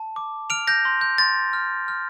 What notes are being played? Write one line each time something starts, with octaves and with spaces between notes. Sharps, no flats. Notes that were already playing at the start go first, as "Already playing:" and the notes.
Already playing: A5
D6
F6 D7 F7
G6 A#6
C6
G6
C6 A6
F6
F6